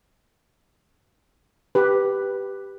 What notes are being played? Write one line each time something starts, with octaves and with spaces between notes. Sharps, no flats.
G4 B4